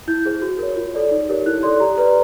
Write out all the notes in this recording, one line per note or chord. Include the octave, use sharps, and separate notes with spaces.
E4 G6
G#4 C5
F#4
A#4 C#5
F4
A4 D5
D#4
G4 A#4 C#5
E4 F#6
A4 D5 C6
G4 A#5
B4 D5 A#5